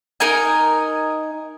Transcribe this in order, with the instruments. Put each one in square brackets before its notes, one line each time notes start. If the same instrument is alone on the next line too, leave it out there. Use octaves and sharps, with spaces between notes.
[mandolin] D#4 A#4 D#5 G#5